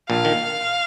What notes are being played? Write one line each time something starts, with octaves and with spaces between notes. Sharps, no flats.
A#1 A#2 F5
D#3